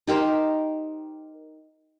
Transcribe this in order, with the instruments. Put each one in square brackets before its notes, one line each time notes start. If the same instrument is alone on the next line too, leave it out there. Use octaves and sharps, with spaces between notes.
[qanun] D#4 G4 A#4 C5